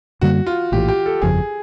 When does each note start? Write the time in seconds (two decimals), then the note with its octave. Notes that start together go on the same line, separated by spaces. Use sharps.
0.21 F#2 D3 G3 A#3 F#4
0.47 F4
0.72 A#1 A2 E3 G4
0.89 G4
1.06 A4
1.22 G1 F2 C#3 F3 G#4